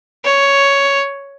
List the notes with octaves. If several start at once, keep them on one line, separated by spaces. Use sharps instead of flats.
C#5